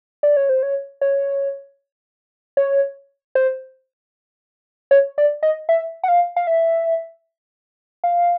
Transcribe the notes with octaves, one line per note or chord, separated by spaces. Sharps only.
D5
C#5
C5
C#5
C#5
C#5
C5
C#5
D5
D#5
E5
F#5
F5
F5
E5
F5